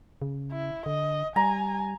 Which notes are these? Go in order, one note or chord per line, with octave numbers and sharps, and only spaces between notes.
C#3
E4
D3 D#5
G3 G#5 A#5